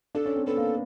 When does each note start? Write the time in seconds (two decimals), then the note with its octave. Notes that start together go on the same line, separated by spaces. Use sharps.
0.15 D4 A4
0.26 C#4
0.36 C4
0.47 B3 A4
0.57 A#3